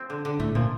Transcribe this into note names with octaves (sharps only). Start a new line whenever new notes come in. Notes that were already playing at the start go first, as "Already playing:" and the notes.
Already playing: F3 C4
D3
D3
A2 A3
A#2 F3